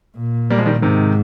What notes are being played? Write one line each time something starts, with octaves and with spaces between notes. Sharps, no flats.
A#2
G3 A#3
F3 G#3
D#3 G3
G#2 C3 D#3